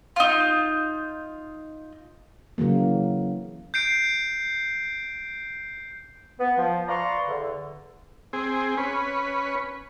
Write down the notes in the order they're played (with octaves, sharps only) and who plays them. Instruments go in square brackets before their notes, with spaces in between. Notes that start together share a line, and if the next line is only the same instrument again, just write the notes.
[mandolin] D#4 F4
[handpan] C#3 E3 F#3 A#3
[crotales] G6 C7 D7
[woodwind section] B3
F3
B4 D5 F5 A#5 C6 C#6
E2 D3
[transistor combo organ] C4 G#4
C#4 B4